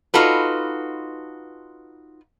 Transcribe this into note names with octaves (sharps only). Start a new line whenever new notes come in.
D#4 F4 F#4 A4 B4